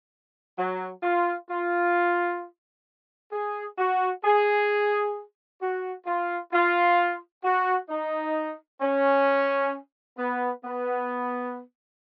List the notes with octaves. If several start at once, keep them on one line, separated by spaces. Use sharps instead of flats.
F#3
F4
F4
G#4
F#4
G#4
F#4
F4
F4
F#4
D#4
C#4
B3
B3